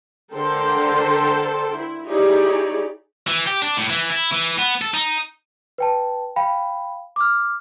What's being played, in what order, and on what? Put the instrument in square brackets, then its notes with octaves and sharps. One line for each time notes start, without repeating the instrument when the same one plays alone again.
[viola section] D3 A4 A#4 C5 G5 C6
E4
D#4 E4 G4 G#4 C#5 D5
[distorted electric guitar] E3
G4
D4
A2
E3
E4
E3
B3
A4
D#4
[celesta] B4 G5 A5
F5 G5 B5
D6 F6